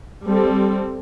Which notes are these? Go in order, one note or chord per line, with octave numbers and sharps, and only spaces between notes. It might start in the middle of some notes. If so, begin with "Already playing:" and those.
G3 C4 A4